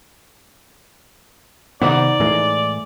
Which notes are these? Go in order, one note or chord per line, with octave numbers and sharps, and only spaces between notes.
C3 D#3 B3 D#4 C5 D5 F#5
A2 E3 G#3